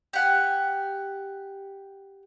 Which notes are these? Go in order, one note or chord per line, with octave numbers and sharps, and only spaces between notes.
G4 F#5 G#5